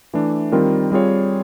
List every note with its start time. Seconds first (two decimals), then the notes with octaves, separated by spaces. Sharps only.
0.14 E3 A3 D4
0.52 D#3 G3 C4 F4 A#4
0.92 G3 C4 F4 G#4 C#5